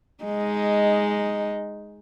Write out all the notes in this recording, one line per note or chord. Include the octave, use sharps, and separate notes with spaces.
G#3 D#4